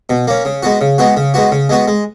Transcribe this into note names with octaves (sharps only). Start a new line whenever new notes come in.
B2
A#3 C#4
C#3
G#3 B3 F#4
C#3
G#3 B3 F#4
C#3
G#3 B3 F#4
C#3
G#3 B3 F#4
G#3